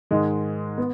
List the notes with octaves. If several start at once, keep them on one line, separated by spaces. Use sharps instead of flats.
G#2 D#3 G#3
B3